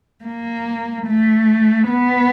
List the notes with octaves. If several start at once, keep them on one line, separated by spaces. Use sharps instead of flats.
A#3
A3
B3